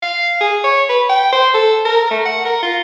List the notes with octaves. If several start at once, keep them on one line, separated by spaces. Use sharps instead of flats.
F5
G#4
C#5
B4
G5
C5
A4
A#4
A3
F#5
A#4
F4